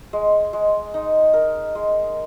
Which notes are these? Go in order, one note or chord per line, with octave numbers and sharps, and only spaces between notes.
G#3
G#3
D#4
A#4
G#3